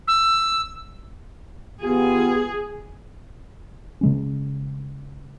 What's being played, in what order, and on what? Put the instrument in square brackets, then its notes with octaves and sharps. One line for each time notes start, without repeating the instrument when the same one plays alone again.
[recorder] E6
[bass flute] B3 [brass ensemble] F4 G4 [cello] G#4
[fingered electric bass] C#3 G#3 C#4